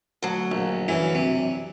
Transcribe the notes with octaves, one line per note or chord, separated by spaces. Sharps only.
D2 F#3
A#1
F#2 E3
C3